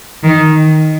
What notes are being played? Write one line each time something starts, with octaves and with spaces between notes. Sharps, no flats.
D#3